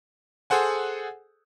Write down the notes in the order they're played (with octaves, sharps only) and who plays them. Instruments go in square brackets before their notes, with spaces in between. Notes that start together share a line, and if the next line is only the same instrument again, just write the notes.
[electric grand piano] G#4 A4 C5 F#5 G#5